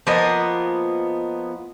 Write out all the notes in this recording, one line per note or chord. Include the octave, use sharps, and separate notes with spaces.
F3 A#3 B3 D#5